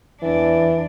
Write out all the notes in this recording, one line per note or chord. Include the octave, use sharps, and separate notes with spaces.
E2 E3 D4